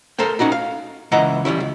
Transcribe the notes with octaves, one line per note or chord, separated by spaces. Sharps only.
A4 A#4 C5 G5
C#4 D#4 F#4 A#4
F5
C#2 E3 E4 D#5 F#5 A#5
E3 G3 C#4 E4
C#2